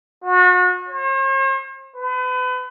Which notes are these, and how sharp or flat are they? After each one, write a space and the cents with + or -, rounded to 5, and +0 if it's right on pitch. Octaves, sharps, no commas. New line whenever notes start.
F#4 -35
C5 +45
B4 +35